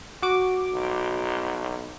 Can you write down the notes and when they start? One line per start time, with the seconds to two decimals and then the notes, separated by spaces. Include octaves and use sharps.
0.22 F#4 D6
0.73 B1